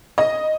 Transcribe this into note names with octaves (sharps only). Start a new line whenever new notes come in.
D#5